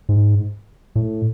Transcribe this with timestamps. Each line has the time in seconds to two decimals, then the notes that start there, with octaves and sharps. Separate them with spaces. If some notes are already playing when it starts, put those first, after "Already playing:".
0.09 G#2
0.96 A2